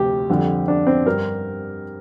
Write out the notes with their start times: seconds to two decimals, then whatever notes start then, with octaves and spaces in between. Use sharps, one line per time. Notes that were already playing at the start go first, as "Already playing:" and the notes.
Already playing: D2 C3 F3 G4
0.30 F2 D3 G3
0.68 D4
0.87 C4
1.06 G2 G3 A#4